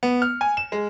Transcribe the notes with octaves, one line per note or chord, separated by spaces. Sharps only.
B3
F6
G#5
E7
G#3